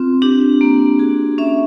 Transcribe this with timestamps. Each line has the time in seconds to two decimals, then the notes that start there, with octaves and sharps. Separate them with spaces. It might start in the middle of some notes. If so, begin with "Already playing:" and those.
Already playing: C4 F4
0.22 D4 G4
0.61 A#3
0.99 F#4 G#4
1.38 C#4 E5